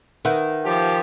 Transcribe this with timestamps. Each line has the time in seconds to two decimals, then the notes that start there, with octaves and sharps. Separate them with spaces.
0.25 D#3 B4 E5 F#5
0.64 F3 G4